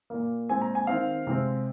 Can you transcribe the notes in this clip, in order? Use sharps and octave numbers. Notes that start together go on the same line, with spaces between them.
A#2 A#3
A#2 G#3 C4 G#5
A#5
G#5
D#3 C4 F5
C3 G#3 C4